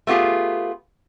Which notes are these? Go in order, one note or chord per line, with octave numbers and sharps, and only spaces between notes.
A3 B3 F4 G4 G#4